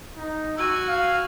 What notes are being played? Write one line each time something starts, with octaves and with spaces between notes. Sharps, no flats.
D#4
F#4 G#5 E6
F5